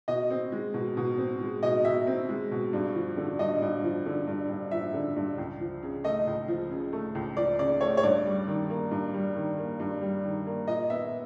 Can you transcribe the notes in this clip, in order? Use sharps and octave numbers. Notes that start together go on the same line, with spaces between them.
B2 D#5
C4
G#3
B2
B2
C4
G#3
B2 D#5
B2 E5
C4
G#3
B2
G2
F3
D3
G2 D#5
G2
F3
D3
G2
G2
F3 E5
D3
G2
C#2
F3
C#3
A3 D#5
C#2
F3
C#3
A3
C#2
F3 D5
C#3 D5
A3 C#5
C#5
G2 D5
G3
D#3
A#3
G2
G3
D#3
A#3
G2
G3
D#3
A#3
A#2 D#5
B3 E5